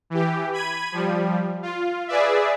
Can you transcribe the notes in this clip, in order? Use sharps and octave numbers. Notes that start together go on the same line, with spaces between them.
E3 G4
B5 G#6 D#7
F3 G3
F4
G#4 B4 D5 E5